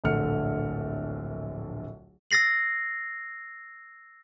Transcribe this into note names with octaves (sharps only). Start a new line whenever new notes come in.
D1 A#1 D3 A3 F6 C#7
E6 A6 A#6 C7 F#7